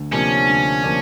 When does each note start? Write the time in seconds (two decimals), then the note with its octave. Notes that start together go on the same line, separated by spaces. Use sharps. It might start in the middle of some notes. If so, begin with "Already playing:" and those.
Already playing: D2
0.12 C3 F3 A#3 C#4 D4
0.48 D2
0.83 F3 A#3 D4